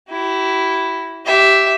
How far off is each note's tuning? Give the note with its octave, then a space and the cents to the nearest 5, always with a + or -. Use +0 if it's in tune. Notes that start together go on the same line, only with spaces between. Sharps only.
E4 +0 G4 -45
G4 -15 E5 +0